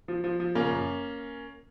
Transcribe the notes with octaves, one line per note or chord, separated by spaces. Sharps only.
F3
F3
F3
C#3 A#3 C#4
F#2